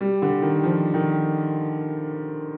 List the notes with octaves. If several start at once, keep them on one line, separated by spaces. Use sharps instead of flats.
G3
D3
D#3
F3
D#3